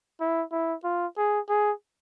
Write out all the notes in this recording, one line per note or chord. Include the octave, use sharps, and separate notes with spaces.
E4
E4
F4
G#4
G#4